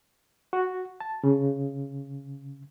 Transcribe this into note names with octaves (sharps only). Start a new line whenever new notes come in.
F#4
A5
C#3